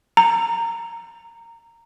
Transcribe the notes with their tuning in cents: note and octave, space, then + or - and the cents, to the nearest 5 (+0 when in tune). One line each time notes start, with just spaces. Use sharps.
A#5 -15